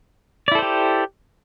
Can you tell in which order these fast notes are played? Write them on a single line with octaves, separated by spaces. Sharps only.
D5 E4 A4 C5 G4